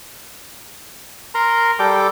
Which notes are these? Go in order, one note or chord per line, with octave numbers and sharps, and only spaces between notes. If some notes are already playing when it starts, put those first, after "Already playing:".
A#4 A#5 C6
G3 A4 G5 D6